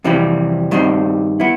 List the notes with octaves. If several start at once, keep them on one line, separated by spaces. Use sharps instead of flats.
F2 C3 E3 G3 C4
G2 D#3 G3 C4
B3 E4